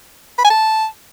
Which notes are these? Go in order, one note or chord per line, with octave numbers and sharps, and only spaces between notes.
B5
G#5
A5